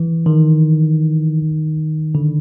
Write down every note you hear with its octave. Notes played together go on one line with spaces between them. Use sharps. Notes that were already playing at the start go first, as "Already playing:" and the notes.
Already playing: E3
D#3
D3